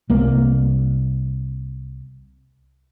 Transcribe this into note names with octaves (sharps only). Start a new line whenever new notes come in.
C2 A#3